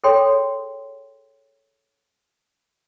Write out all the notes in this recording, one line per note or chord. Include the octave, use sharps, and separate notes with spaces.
G#4 A4 C#5 G5 C6